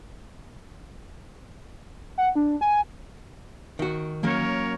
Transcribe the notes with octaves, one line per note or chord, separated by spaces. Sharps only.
F#5
D4
G#5
D#3 F#4
F#3 A#3 C#4 A#4 C#5